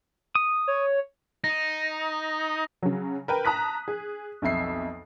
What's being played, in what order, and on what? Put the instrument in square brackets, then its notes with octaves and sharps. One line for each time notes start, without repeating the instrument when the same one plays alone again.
[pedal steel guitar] D#6
[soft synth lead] C#5
[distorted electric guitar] D#4 [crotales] A#6
[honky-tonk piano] C#3 F#3
A#4 B4 G5
A5 A#5 D#6 F#6 B6
G#4
B1 F2 E5 C7